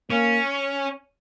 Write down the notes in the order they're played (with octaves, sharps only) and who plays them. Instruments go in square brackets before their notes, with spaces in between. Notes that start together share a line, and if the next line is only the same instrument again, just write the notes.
[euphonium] A#3 [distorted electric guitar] C#4